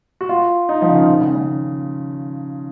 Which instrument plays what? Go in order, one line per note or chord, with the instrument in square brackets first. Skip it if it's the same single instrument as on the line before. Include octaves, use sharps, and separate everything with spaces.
[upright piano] F#4
F4
D#4
F3
C#3
D#3
D#3
C#3
C#3